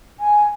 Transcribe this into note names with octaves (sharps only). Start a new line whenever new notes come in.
G#5